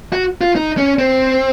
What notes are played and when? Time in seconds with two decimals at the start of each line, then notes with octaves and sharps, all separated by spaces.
0.13 F#4
0.41 F4
0.56 D#4
0.78 C#4
0.99 C4